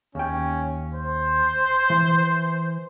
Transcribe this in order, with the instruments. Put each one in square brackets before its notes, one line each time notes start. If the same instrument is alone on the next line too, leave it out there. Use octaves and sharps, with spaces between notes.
[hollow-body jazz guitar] D#2 G5 [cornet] C#4
[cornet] C5
[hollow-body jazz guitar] E3